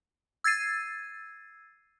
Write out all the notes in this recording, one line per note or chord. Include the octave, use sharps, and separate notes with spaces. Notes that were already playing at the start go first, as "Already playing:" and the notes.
E6 G#6 A6 C7 D#7